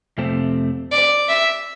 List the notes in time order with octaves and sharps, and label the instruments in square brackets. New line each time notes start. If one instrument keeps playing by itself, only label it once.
[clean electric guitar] F2 C3 F3 A3 C4
[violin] D5
E5